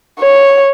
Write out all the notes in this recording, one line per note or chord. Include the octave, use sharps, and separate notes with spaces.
C#5